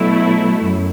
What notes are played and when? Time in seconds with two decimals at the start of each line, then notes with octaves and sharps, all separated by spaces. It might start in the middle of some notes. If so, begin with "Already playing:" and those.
Already playing: B2 F#3 A3 E4
0.62 F#2